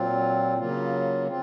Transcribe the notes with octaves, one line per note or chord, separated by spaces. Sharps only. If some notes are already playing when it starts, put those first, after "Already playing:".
Already playing: A#2 F#3 C4 F4
C#3 F#3 A#3 F4
C4 F4